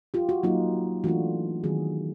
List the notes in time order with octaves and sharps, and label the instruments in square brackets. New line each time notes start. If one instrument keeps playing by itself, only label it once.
[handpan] F4 G4
F#4
F#3 A#3 D#4 F4
E3 A3 D4 F4 F#4
D#3 F#3 B3 F#4 G#4